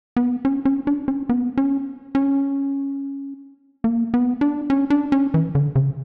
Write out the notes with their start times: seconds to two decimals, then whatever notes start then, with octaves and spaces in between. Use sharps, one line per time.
0.17 B3
0.45 C#4
0.65 C#4
0.87 D4
1.08 C#4
1.29 B3
1.58 C#4
2.15 C#4
3.84 A#3
4.14 B3
4.41 D4
4.70 C#4
4.90 D4
5.12 C#4
5.34 E3
5.55 D3
5.76 C#3